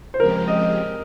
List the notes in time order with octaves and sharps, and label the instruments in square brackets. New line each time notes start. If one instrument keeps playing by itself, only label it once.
[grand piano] C5
[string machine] C#3 F3 G#3 C4 G4 [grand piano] A#4
[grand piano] D#5